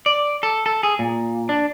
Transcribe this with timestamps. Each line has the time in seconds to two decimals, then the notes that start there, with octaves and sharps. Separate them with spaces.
0.06 D5
0.43 A4
0.66 A4
0.83 G#4
0.99 A#2
1.49 D4